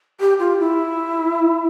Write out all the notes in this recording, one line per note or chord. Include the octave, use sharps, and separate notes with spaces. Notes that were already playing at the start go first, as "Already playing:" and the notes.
G4
F4
E4